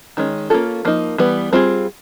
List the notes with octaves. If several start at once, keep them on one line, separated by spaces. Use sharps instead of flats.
D#3 G#3 C#4
A#3 C#4 F4 A4
F3 A#3 D#4
E3 G3 B3
G3 C4 F4 G#4